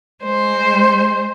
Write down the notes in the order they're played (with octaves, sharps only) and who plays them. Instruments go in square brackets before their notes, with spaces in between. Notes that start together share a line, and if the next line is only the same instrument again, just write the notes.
[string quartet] G#3 C5